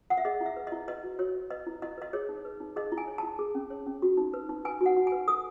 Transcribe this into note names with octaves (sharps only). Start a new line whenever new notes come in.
F#5
E5
G#4 D#5
E4
E5
B4
E4 D#5
B4 D#5
F#4
F#4 C#5
B4
B4 D#5
E4
E4 D#5
B4 D#5
G#4 C#5
D#4
B4
D#4
G#4 D#5
E4
G#5
C#5
E4 A5
G#4
C#4
C#5
C#4
F#4
D#4
B4
D#4
B4 G#5
F#4
F#5
F#4
G#5
B4
A4 D#6